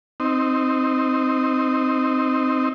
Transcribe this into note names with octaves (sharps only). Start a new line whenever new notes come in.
C4 D#4